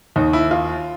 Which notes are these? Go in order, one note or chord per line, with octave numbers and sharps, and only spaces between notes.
D#2 D#3 D#4
E4
F4